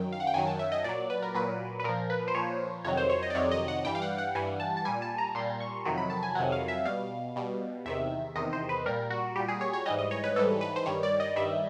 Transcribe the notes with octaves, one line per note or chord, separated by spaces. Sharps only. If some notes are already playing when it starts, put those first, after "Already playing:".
Already playing: F#2 D#3 F#3 G5
F5
F#5
G5
F#2 D#3 F#3 G#5
A5
E5
D#5
A#2 F#3 D5
B4
A#4
A#2 F#3 B4
B4
A#2 F3 A#4
B4
C5
A#2 F3 C#5
F2 C3 D#3 F#3 C#5
C5
C#5
D#5
D5
F2 C3 D#3 F#3 C#5
D#5
F#5
G2 E3 G3 G5
F5
F#5
F#5
G2 E3 G3 G#5
A5
A5
A#2 G3 G#5
A5
A#5
A#2 G3 C6
C#6
F2 C3 D#3 F#3
B5
A5
G#5
F2 C3 D#3 F#3 F#5
F5
E5
B2 G3 F5
B2 G3
E2 C3 D#3 E5
E2 C3 D#3 D#5
C5
B4
A#2 G3 A#4
F#4
A#2 G3 G4
G#4
C#5
C#5
G#2 E3 G3 D#5
D#5
C#5
B4
G#2 E3 G3 A4
B4
C5
G2 D#3 G3 C#5
D5
D#5
G2 D#3 G3 E5